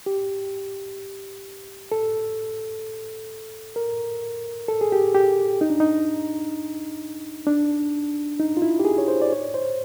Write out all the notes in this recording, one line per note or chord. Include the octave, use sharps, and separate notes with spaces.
G4
A4
A#4
A4
G#4
G4
G4
D#4
D4
D#4
D4
D#4
F4
E4
G4
G#4
C#5
C5
D5
C#5
C5